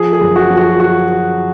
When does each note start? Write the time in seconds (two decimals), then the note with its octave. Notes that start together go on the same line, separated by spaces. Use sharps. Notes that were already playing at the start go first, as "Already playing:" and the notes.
Already playing: F3 G#4
0.13 G#4
0.21 F#2
0.36 F#4
0.50 F3
0.57 F#4
0.80 F#4